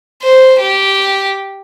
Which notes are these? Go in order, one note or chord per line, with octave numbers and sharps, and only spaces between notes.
C5
G4